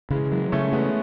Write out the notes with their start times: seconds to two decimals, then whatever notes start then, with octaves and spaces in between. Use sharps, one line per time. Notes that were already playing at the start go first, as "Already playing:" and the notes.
0.10 C#3 E3 G#3
0.31 E3 F#3 G#3
0.52 C#3 A3 C#4
0.72 G#3 A3 B3